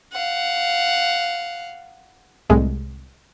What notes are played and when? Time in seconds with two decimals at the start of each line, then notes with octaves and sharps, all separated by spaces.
0.12 F5 F#5
2.50 C2 A2 G#3